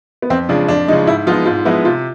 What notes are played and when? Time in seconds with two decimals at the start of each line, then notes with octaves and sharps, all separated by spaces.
0.22 B3
0.30 F2 C4
0.49 C#3 F3 G#3 D4
0.68 F2 D4
0.88 C#3 F3 G#3 D#4
1.07 G#2 E4
1.27 F3 G#3 B3 D#4 F4
1.46 G#2 F4
1.65 F3 G#3 B3 D#4 E4
1.85 C3 F4